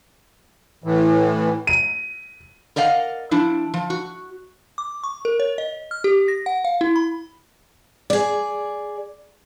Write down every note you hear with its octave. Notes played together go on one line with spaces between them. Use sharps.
A2 E3
D#7
A#4 D5 D#5 F5 F#5
F3 D4 E4
F3
F#4
D6
C#6
A#4
C#5
D#5
F6
G4
A#6
F#5
F5
E4
B5
G#4 D5